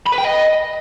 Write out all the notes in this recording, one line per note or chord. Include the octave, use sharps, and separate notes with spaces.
B5
B4
G5
D#5